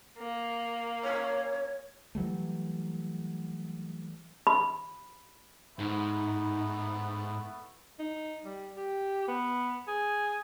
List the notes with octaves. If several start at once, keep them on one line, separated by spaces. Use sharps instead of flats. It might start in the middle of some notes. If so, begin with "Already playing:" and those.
A#3
C#5
E3 F#3 G3 A3
B5
G#2 A3 B3 D#4 E4
D#4
G3
G4
B3
G#4